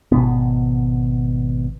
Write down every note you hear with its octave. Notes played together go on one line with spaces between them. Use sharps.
G#1 B2 B3